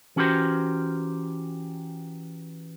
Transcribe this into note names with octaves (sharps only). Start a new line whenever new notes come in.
E3 C#4 F#4 G4 A#4 C5